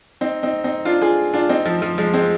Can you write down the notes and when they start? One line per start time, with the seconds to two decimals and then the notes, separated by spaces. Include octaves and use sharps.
0.21 C4 D#4
0.43 C4 D#4
0.64 C4 D#4
0.85 D4 F4
1.01 F4 G#4
1.34 D4 F4
1.49 C4 D#4
1.65 F3
1.82 F3
1.98 F3 G#3
2.13 G#3 C4